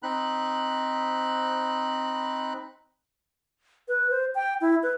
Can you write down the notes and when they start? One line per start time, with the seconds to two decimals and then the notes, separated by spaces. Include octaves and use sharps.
0.03 C4 D#4 B5 F#6
3.88 B4
4.11 C5
4.35 G5
4.61 E4
4.83 B4